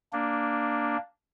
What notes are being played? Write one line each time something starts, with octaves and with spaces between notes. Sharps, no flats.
A#3 D4